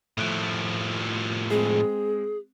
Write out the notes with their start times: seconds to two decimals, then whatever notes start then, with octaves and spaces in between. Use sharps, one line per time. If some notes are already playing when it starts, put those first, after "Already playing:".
0.17 A2 F3 A3 F#6 D7
1.51 G#3 C4 G#4